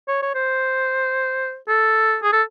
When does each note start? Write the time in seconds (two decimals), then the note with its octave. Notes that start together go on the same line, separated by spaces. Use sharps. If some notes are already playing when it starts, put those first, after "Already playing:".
0.08 C#5
0.23 C#5
0.35 C5
1.68 A4
2.23 G#4
2.33 A4